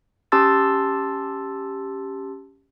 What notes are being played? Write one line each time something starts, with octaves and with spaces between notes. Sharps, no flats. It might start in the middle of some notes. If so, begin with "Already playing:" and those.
C#4 G4 A5 C6 E6 A6